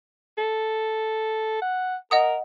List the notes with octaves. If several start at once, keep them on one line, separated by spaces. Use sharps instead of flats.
A4
F#5
A#4 D#5 F#5 D#6